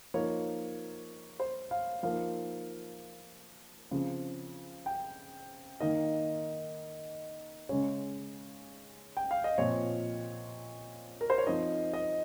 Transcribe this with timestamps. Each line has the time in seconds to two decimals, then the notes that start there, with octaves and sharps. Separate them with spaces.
0.14 F3 A#3 D#4 C#5
1.40 C5
1.71 F5
2.03 F3 A#3 D#4 F5
3.91 C#3 F3 C4
4.86 G5
5.80 D#3 A#3 D#4 D#5
7.69 C#3 G#3 C#4 C#5
9.17 G5
9.31 F5
9.44 D#5
9.58 A#2 F3 C4 C#5
11.21 A#4
11.30 C5
11.38 C#5
11.47 F3 C4 D#4 D#5
11.94 D#5